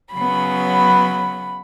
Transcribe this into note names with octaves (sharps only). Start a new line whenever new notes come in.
C#3 F#3 B3 B5